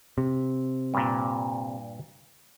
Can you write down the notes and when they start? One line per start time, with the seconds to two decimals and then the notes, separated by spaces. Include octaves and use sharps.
0.18 C3
0.94 G2 A#2